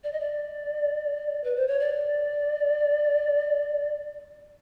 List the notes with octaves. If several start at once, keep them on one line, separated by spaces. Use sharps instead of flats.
D5
D#5
D5
B4
C5
C#5
D5